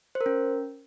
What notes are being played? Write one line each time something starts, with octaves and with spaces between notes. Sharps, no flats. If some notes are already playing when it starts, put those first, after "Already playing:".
C5
A#4
C#4